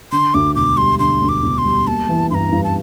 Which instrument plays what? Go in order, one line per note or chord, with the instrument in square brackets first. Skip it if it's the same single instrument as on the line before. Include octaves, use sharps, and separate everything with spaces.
[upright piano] D3 [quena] C6
[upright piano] D2 [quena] D6
[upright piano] E1 [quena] D6
[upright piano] G3 [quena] C6
[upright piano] D3 [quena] C6
[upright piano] D2
[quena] D6
[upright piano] E1
[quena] C6
[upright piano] G3
[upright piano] A#3 [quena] A5
[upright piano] E3
[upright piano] G2 [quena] C6
[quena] A#5
[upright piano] G2
[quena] A5